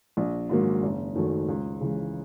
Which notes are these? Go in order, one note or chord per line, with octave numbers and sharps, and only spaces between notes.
A#1
G#2 D#3 F#3 A#3
F#1
F#2 D#3 F#3 A3
C#2
C#3 E3 G#3